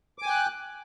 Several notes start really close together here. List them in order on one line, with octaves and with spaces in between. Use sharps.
D6 G#5 G5 F#6